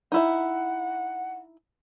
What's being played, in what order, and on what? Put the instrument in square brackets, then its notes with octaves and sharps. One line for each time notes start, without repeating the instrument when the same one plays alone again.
[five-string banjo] D#4 E4 E5 [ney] F#5